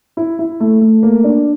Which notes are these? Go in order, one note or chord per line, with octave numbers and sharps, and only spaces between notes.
E4
E4
A3
A3
A#3
D4